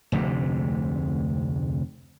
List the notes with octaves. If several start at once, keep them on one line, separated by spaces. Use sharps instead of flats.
F1 D2 G#2 C3